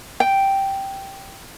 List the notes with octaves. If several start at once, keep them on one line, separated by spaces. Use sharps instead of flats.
G5